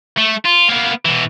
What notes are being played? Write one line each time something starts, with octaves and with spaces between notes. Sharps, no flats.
A3
F4
A#3 B3
B2 E3